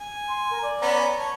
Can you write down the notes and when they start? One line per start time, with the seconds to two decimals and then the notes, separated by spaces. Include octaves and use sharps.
0.01 G#5
0.28 C6
0.50 A#4
0.62 D5
0.82 B3 C#4 A#5
1.18 C#5 A5